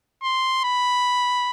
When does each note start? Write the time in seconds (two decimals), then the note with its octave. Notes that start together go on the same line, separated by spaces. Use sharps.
0.23 C6
0.65 B5